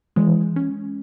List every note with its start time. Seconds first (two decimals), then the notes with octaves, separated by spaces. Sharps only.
0.16 E3 G#3
0.56 C#4